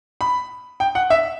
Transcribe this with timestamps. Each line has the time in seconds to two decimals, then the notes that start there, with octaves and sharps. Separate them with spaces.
0.21 B5
0.80 G5
0.95 F#5
1.10 E5